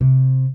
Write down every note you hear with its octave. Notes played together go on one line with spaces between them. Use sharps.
C3